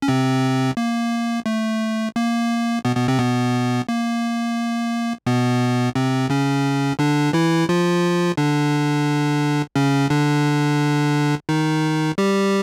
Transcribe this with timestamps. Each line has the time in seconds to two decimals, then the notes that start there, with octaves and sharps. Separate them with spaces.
0.02 C#4
0.08 C3 C4
0.77 A#3
1.46 A3
2.16 A#3
2.85 B2 B3
2.96 B2 B3
3.08 C3 C4
3.18 B2 B3
3.89 A#3
5.26 B2 B3
5.95 C3 C4
6.30 C#3 C#4
6.99 D3 D4
7.33 E3 E4
7.69 F3 F4
8.37 D3 D4
9.76 C#3 C#4
10.10 D3 D4
11.49 D#3 D#4
12.18 G3 G4